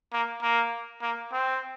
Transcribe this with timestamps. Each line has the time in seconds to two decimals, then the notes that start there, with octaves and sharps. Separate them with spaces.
0.13 A#3
0.42 A#3
1.02 A#3
1.32 C4